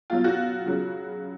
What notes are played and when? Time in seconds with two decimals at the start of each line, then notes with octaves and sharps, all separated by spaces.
0.10 B2 F#3 F4
0.24 F#4
0.66 C#3 F#3